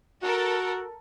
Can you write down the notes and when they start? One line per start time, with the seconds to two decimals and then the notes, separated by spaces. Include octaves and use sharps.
0.23 F#4 A4 A#4